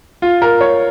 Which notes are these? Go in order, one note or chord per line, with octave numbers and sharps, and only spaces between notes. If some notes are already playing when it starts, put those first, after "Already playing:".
F4
A#4
C#5